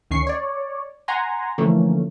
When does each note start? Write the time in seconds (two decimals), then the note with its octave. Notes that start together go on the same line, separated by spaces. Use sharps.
0.11 D2 D#3 C#4 C#6 C7
0.27 C#5 D5
1.08 F#5 G#5 A#5 C6
1.58 D3 E3 F3 A3 A#3 C#4